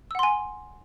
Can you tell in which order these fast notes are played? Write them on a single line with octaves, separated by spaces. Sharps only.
E6 F#5 C6 G#5